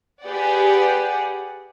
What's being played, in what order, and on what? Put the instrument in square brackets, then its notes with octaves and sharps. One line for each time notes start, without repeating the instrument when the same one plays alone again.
[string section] G4 G#4 B4 D5 F#5